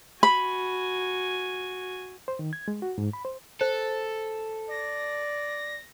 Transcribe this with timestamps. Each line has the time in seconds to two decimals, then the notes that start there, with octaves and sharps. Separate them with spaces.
0.23 F#4 G#5 B5
2.28 C5
2.39 D#3
2.53 G#6
2.68 G#3
2.82 F#4
2.98 G#2
3.13 B5
3.25 C5
3.61 A4 C5
4.70 D5 A#6